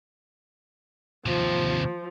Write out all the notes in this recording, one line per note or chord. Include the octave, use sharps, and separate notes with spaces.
D#2 C3 F3